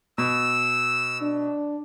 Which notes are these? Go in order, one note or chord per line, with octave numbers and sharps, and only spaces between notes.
B2 E6
D4